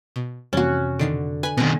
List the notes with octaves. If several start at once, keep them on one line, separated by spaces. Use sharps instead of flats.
B2
F2 C3 E3 G3 A#3 C#4 F#4
B2 D3 D#3 C7
B4 G#5 B5
B2 D#3 B3 C4